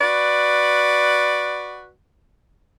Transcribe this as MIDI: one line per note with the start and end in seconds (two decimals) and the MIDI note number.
0.01 1.90 66
0.01 1.90 71
0.01 1.90 74